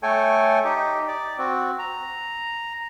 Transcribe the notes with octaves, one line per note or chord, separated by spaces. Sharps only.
A3 A4 C#5 G5 G#5
D#4 G4
D5
C4 F#4
A#5